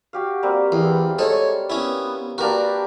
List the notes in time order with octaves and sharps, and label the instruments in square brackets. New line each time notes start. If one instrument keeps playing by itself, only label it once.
[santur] F#4 G4 F5
G3 A#3 C4
[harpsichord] E2 [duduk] E3 [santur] F5
[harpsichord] G#3 A4 [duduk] C#5
[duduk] B3 [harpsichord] C#4 E4
[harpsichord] A#3 F#4 [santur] D4 G4 A#4 [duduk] B4